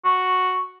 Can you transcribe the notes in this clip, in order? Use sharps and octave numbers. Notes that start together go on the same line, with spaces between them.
F#4